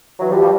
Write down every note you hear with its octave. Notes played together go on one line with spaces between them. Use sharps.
E3 F#3
F3 G3
F3 G3